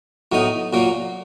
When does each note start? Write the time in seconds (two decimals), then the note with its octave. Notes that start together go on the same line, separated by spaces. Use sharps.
0.32 A2 F#3 B3 D#4
0.73 A#2 F#3 A#3